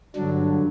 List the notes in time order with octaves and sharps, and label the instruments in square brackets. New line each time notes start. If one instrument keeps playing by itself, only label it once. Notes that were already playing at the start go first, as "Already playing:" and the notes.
[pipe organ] G2 D3 F#3 D4